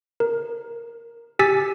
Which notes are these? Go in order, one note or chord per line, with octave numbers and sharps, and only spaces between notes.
A#4
G4 G#5 E6 A6 B6